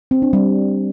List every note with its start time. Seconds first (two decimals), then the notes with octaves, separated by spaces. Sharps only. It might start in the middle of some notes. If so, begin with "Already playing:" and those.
0.11 C4
0.22 D4
0.33 G3